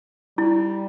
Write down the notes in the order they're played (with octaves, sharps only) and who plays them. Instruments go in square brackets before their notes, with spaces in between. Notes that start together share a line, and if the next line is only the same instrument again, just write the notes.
[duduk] G3 [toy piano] E4